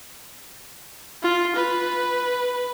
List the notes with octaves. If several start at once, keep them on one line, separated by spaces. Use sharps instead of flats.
F4
B4